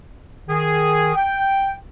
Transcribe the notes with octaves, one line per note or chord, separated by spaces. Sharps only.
D#3 G#4
G5